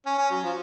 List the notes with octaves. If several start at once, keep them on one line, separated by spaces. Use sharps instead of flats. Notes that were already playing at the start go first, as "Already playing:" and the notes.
C#4
C#4
F#3
F3